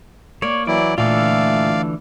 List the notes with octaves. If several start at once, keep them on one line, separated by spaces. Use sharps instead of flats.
A#3 C#5 D5
E3 F#3 E4 D5
A#2 D3 E3 A3 F4 D5 F5